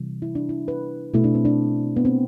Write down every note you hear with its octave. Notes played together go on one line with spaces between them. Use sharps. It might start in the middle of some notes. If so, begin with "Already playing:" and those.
Already playing: C3 E3 G3
E4
D4
E4
B4
B2 A3 E4
D4
C4
D4
B3
C4